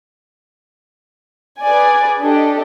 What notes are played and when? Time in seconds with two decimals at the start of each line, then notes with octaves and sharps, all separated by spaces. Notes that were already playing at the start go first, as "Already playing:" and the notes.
1.63 G#4 B4 D5 G#5
2.21 D4 G4 A4 D#5